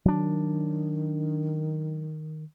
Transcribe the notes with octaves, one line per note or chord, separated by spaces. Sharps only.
D#3 F#3 D4